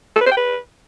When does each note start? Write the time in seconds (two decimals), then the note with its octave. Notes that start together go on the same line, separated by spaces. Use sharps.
0.16 A4
0.21 B4
0.26 C5
0.31 G5
0.37 B4